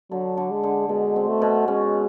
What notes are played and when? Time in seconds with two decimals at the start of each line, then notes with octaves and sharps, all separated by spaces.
0.11 D3 F#3
0.37 D3
0.51 G#3
0.63 D3
0.89 B2 G#3
1.16 C4
1.28 A3
1.42 B2
1.67 G#3 C#4